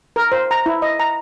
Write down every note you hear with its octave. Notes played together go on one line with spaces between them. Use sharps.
A#4
C5
A#5
E4
D#5
A#5